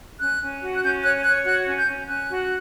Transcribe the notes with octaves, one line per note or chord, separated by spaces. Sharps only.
C#4 F#6
C#4
F#4
F#6
C#4 G6
C#5 F#6
C#5 F#6
F#4 F#6
C#4
G6
C#4
C#4 F#6
F#4